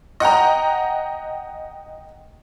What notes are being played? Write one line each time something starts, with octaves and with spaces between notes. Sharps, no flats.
D#5 F#5 G5 A#5